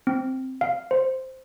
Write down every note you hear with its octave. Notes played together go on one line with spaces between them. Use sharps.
C4
F5
C5